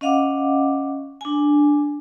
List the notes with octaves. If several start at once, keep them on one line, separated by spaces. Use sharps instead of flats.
C#4 D#5 F5 F#5 D6
D4 G#5